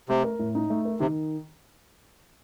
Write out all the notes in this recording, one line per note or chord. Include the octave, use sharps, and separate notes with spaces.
C3 A3
A#4
A2
D#4
A3
A#4
C3 D#3